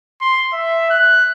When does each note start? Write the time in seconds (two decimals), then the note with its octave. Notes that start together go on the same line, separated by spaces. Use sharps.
0.21 C6
0.53 E5
0.90 F#6